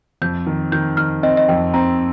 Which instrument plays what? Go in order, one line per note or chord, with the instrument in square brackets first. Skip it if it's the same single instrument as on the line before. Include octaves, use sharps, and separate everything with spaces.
[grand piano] F2 [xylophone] G6
[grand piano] D#3
[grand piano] D#3 [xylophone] G6
[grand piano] D#3 [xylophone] F6
[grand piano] C4 [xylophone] D#5
[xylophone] D#5
[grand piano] F2 [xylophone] G5
[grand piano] C4 [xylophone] A#5